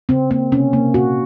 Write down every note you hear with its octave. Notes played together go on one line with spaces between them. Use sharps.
C#3 C4
A#3 C4
C3 C#4
A#3
A#2 F#4